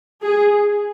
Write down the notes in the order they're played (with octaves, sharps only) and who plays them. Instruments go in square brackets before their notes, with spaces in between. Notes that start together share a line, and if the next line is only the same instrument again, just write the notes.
[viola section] G#4